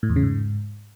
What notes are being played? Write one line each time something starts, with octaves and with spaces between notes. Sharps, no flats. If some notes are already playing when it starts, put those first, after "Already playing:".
A2
E2
C#3
G#2